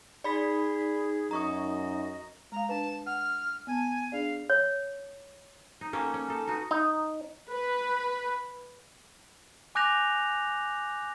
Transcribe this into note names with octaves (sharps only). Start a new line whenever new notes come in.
D#4 G#4 D5 B5 B6
F#2 D#5 A#5 C#6 D#6
G#3 F5 A#5
D4 B4 A5
F#5 F6
B3 G#5 A5
D4 G#4 D5 F5
C#5
D#4
A#3 C#4 G4 A4
C#4
D#4 A4
D#4 F#4 B4
D#4
B4
G#5 D6 F#6 G6 A#6 F7